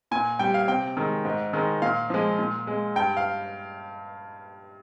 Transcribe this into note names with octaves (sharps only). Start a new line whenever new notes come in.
A#2 G#5
G3 G5
F5
C3 G5
D#3 G#3
G#2
D#3 G#3
A#2 F5
F3 G#3
A#2
G#3
G2 G5
F5